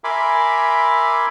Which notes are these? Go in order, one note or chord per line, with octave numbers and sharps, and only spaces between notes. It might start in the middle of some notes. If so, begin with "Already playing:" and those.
A#4 E5 G#5 B5 C6 D6